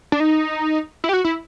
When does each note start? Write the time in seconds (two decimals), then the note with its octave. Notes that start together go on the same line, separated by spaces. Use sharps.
0.12 D4
0.20 D#4
1.04 E4
1.09 G4
1.13 F#4
1.24 E4